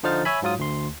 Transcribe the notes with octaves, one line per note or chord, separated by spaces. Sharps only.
D3 F3 D#4 C5 F6 A6
C#5 E5 G#5 B5
G#2 F#3 F4 D#6
D2 C6